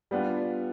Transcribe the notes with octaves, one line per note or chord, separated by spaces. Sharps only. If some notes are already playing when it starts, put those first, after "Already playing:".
G3 B3 D4 F4